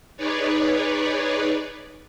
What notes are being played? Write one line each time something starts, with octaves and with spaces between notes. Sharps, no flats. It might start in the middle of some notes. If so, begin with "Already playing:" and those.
D#4 G#4 B4 C#5 D5